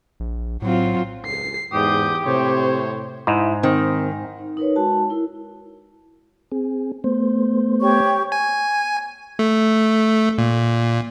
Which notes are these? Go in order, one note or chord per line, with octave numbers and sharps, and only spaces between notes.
A#1
A2 F#3 C4 F4
C#2 C7
E2 G#2 G4 D#6 G6
A2 C3 C5 C#5
G#2 E4 D#5 E5
D#3 C4
D#4
D#4 A#4 B4 C#5
G#3 F#4 A5
E4 A#4
C4 G#4
A3 B3 C5
G4 C#5 C#6
G#5
A3
A#2